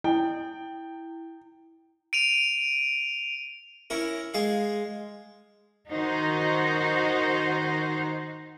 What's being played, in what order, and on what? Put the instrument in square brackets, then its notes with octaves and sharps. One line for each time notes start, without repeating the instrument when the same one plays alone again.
[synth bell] E4 [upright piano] G5
[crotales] D7 D#7 F7
[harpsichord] C#4 E4 A#4
G#3 G#4 F5
[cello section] D#3 D#4 F#4 C5